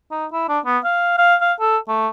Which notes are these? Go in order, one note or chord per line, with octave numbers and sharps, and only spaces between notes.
D#4
E4
D4
B3
F5
F5
F5
A4
A3